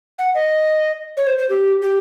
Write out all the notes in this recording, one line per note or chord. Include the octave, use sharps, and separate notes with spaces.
F#5
D#5
C#5
C5
C5
G4
G4